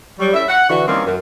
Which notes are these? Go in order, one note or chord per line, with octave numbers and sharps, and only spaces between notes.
F#3 G3
C#4 E4 A4 E5
F#5
D3 E3 F#4
D#3 E3 G3 A#3 C4 C#4
F#2